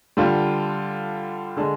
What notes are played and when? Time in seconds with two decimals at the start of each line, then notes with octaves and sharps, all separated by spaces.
0.17 D3 G3 D4 F4
1.57 D3 G#3 D4